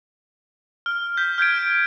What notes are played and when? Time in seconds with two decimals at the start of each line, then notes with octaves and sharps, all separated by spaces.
0.86 F6
1.17 G6 B6
1.38 F6 G6 G#6 D7